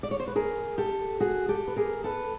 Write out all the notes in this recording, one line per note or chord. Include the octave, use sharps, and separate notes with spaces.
D5
C#5
C5
B4
G#4 A#4
G4 A4
F#4 G#4
G4 A4
B4
G#4 A#4
A4 B4